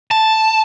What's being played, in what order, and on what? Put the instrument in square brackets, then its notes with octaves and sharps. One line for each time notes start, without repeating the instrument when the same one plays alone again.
[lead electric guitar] A5